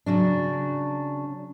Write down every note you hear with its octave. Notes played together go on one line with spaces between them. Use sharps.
C#3 F#3 D4